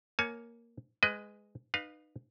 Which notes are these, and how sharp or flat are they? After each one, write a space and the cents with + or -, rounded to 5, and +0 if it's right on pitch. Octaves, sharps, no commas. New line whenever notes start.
A#3 +0 C#5 +0 G#5 +35
G#3 +0 B4 +30 D#5 +0
D#4 -25 B4 +0 F5 +15